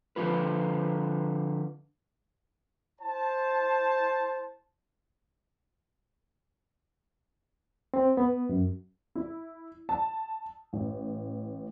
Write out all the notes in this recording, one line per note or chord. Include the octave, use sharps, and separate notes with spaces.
D3 F3 F4 B4
E4 C5 A5
C4
B3
F#2
E4
A5
A1